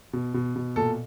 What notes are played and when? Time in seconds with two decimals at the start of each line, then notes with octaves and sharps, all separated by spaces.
0.13 B2
0.34 B2
0.56 B2
0.76 A#2 A4